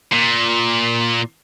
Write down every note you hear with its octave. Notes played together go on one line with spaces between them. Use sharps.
A#2